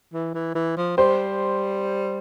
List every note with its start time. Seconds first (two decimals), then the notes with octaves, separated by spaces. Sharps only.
0.13 E3
0.34 E3
0.55 E3
0.77 F3
0.97 G3 C5